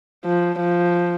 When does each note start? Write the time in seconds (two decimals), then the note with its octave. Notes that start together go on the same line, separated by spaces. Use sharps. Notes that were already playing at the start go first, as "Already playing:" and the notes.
0.25 F3
0.59 F3